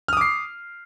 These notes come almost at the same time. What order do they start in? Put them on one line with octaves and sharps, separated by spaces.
F6 D#6 D6 C7